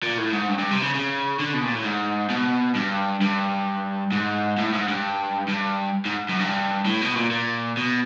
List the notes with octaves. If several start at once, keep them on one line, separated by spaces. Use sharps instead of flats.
A#2
A2
G#2
G2
G2
C3
C#3
C#3
D3
B2
A#2
A2
G#2
B2
G2
G2
G#2
A2
G#2
G2
G2
G#2
F#2
G2
A2
B2
A#2
A#2
B2